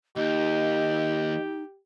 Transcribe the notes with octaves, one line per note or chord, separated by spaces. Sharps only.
D#2 D#4 G4 D#5